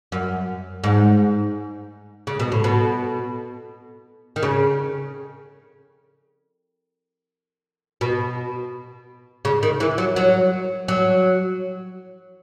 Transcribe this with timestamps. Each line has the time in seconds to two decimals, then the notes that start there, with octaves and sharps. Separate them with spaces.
0.12 F#2
0.84 G#2
2.27 C#3
2.39 B2
2.52 A2
2.64 B2
4.36 D#3
4.42 C#3
8.01 B2
9.45 C#3
9.63 D#3
9.80 E3
9.98 F#3
10.16 F#3
10.88 F#3